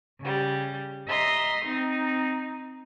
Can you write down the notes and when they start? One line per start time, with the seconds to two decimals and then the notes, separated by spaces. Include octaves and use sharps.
0.20 C#3 G3
1.09 D#5 E5 A#5 C6
1.66 C4 D#4